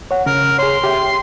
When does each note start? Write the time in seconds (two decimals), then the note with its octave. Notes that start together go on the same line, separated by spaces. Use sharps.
0.11 C#5 F#5
0.26 C#3 A#4
0.59 G#4 C#5 C6
0.84 G4 E5 G5